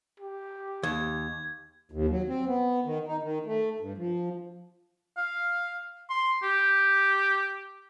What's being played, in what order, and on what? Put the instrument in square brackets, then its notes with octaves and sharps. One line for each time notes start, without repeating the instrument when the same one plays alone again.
[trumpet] G4
[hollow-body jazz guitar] D#2 [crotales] G#6
[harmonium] D#2
F#3
C4
B3
D#3
D#4
D#3
A3
G2
F3
[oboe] F5
C6
G4